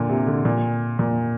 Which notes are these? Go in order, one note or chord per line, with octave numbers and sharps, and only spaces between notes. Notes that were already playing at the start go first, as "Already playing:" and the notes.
Already playing: A#2 D3
C3
D3
A#2
A#2